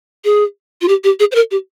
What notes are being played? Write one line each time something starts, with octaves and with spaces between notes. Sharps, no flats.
G#4
F4
G4
G4
G#4
C5
A#4
G4